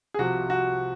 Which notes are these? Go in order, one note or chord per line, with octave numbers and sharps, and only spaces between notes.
G#4
C2 C3 F3 F#4
F#4